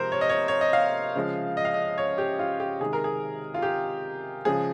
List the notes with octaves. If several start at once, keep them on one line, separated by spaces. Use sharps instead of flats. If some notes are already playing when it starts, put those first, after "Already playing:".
Already playing: C3 F3 G#3 A#4 C5
C#5
D#5
C#5
C#5
D#5
F5
C#3 F3 G#3
D#5
F5
D#5
C#5
G4
F4
G4
C3 D#3 G#3 G#4
A#4
G#4
F4
G4
C#3 F3 G#3 G#4